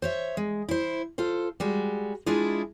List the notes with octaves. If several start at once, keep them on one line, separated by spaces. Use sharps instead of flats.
C5 C#5 E5
G#3
E4 C5
F4 A4 C5
G3 G#3 F#4
G#3 D4 E4 F4 G#4